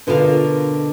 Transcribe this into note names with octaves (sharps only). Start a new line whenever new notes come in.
B2 D3 F4 A#4 C5 F5